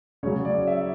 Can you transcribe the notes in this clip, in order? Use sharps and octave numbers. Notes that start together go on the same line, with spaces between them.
C#3 F#3 C#5
D5
E5